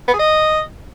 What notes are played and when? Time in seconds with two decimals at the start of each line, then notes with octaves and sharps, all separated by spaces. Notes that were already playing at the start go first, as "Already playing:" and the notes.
0.08 B3
0.14 G#4
0.19 D#5